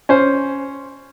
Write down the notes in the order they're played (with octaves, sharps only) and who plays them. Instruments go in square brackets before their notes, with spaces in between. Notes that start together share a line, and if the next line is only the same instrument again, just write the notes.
[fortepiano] C#4 C5